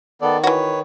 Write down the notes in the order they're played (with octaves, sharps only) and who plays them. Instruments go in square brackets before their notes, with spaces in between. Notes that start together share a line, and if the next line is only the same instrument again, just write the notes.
[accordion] D#3 [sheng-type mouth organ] B3 A4 D5
[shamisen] E3 F#4 [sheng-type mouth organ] B4 C#5